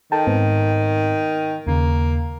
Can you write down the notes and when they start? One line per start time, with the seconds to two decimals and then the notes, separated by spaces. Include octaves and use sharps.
0.12 D#3 A4 G5 A5
0.26 G#2 B3 C4
1.67 D#2 C#3 A#3